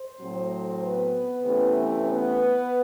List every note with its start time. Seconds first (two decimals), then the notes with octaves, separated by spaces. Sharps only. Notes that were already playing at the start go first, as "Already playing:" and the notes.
Already playing: C5
0.20 A2 F#3 A3 C4
0.82 B3 B4
1.43 C3 E3 A3 C#4
2.04 B3 B4